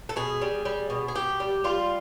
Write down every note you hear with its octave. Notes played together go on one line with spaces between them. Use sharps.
A4
B2 G#4
G3
G3
B2
G#4
B2 G4
G3
G3 F4